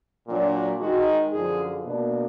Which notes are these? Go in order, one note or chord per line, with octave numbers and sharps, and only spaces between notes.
A#2 F#3 D4
D#3 G#3 D#4 F#4
F#2 D3 F3 G#4
B2 A#3 D4